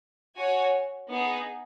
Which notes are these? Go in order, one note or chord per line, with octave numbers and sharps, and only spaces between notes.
F#4 C#5 G#5
B3 D#4 G#4